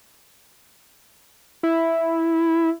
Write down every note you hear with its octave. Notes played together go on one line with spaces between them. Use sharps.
E4